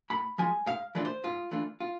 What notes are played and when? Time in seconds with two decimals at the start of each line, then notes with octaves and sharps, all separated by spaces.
0.10 A2 B5
0.38 F3 G#3 G#5
0.67 G#2 F5
0.95 E3 A3 D4 F4 D5
1.05 C5
1.24 G#2 F4
1.51 E3 A3 D4 F4
1.80 F4